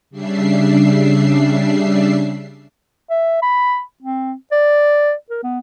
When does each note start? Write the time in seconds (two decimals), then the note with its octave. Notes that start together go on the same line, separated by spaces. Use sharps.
0.10 C#3 G3 D4 E5 C7
3.09 E5
3.42 B5
4.02 C4
4.52 D5
5.30 A#4
5.43 B3